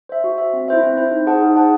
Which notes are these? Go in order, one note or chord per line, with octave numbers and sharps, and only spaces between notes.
C5 E5
F#4
C5 E5
C4
E4 C5 E5
C4
E4 C5 E5
D#4
G#4 C5 F#5 A5
D#4
G#4 C5 F#5 A5